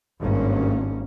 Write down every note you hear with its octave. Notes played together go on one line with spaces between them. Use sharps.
G#1 G2 A#3 C#4